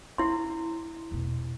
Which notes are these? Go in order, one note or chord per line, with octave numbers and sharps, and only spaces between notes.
D4 E4 C6
E2 B2